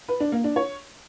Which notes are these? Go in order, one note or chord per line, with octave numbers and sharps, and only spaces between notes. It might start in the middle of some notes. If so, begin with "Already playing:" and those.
B4
D4
A#3
D4
C#5